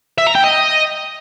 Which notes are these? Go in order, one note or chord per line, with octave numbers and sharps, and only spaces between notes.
E5
A#5
G5
D#5